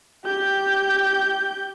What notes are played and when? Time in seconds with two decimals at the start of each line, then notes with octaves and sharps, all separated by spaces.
0.24 G4 G6